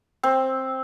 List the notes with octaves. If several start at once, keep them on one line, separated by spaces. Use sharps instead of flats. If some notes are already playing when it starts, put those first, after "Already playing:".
C4